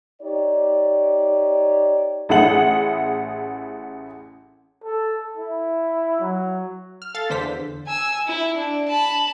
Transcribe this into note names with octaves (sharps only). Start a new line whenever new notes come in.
D#4 G4 C#5 D5
A1 E4 G#4 F#5 F#7
A4
E4
F#3
F6
A4 F5 A6
E2 D3 C5 B6
G#5 E6
E4
D4
A5 B5